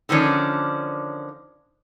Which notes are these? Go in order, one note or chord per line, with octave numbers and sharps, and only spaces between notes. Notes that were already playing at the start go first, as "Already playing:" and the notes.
D3 D#3 F3 C#4 D4